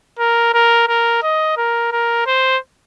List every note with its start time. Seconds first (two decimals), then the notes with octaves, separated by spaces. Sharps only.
0.19 A#4
0.54 A#4
0.89 A#4
1.23 D#5
1.57 A#4
1.92 A#4
2.27 C5